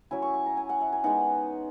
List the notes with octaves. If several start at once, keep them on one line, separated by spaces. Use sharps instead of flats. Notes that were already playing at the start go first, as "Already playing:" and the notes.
F#3 C#4 E4 G#5
C#6
C#6
A#5
G#5
F#5
E5
G#5
G#3 B3 D#4 F#5